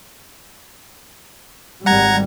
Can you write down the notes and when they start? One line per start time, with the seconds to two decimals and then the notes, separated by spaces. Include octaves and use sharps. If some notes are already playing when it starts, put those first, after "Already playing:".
1.86 G#1 G3 F#5 A#5 G#6